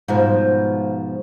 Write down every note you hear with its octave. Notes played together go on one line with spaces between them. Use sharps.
G#2 B2 F3